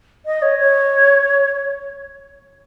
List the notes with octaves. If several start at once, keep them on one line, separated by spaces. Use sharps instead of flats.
D#5
C#5
C#5